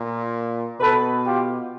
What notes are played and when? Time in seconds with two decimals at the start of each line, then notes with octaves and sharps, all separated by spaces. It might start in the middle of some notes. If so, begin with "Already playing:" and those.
Already playing: A#2
0.80 B2 A4 B4
1.26 F4 G4